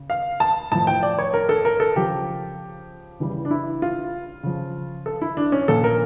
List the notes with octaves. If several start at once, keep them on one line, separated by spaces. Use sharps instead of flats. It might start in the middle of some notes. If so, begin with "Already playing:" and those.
Already playing: C#3
F5
A5
A2 F3 A5
G5
D5
C#5
A#4
A4
A#4
A4
C#3 F3 G4
C#3 E3 G3
D4
E4
F4
C#3 F3
A4
E4
D4
C#4
A#2 F3 A4
A#4